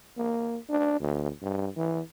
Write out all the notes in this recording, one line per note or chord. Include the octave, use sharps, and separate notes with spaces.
A#3
D4
D2
G2
E3